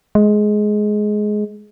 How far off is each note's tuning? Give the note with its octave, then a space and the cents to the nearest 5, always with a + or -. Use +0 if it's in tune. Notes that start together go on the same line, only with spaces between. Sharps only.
G#3 +15